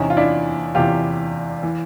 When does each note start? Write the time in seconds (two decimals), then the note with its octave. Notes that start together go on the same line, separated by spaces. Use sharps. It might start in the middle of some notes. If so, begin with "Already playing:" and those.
Already playing: E2 C3 E3 C#4 D#4
0.10 F4
0.17 D4 E4
0.75 E2 C3 E3 F4 G4
1.63 E3